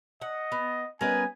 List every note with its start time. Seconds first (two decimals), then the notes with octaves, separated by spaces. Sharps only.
0.22 D#5 F#5
0.52 B3
1.01 G3 B3 C#4 A#4 B4 D#5 G#5